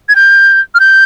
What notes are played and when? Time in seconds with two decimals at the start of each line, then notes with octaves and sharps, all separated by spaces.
0.09 G#6
0.16 G6
0.75 F6
0.80 G6